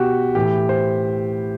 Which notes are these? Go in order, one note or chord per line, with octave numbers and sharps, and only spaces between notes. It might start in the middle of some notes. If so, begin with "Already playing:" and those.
Already playing: B2 F#4 G4
A2 E3 G4
C5